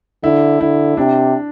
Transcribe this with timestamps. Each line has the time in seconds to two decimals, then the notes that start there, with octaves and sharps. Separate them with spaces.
0.23 D3 E4
0.61 D3 E4
0.97 C3 D4